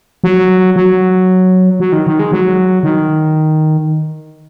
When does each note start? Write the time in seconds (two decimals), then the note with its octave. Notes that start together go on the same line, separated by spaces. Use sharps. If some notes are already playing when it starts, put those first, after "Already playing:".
0.24 F#3
0.76 F#3
1.80 F#3
1.92 D#3
2.07 D#3
2.19 G#3
2.32 F#3
2.83 D#3